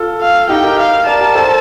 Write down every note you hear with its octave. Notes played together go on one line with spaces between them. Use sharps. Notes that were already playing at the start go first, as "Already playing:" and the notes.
Already playing: F4 A4
F5
D#4 G4 G5
G4 A#4
F5
A#4 D5 A5
G4 A#4
A4 C5